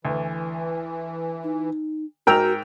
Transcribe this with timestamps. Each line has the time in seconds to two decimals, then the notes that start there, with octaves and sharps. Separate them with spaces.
0.05 D2 E3
1.44 D#4
2.27 G#2 F#4 A#4 G5 E6 F7